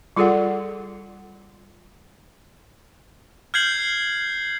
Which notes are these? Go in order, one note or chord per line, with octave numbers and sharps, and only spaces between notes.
G3 F4 G#4 A4 D5 F#5
F6 G6 G#6 C7 F#7